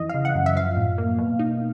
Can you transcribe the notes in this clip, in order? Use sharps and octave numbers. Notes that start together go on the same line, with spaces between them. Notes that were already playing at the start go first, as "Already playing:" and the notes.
Already playing: F2 E3 D#5
C#3 F5
F#5
F#2
E5
F3 F5
A2
A#3
B2
D#4